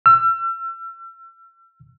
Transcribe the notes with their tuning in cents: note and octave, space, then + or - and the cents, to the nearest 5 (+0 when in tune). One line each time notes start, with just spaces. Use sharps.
E6 +40